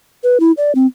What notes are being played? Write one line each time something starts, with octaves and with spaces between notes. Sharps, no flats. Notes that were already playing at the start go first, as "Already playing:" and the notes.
B4
E4
D5
C4